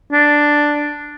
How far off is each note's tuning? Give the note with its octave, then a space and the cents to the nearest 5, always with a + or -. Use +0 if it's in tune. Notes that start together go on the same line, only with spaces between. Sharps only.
D4 +0